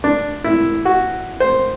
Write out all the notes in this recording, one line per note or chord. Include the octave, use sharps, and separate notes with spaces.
D4
E4
F#4
C5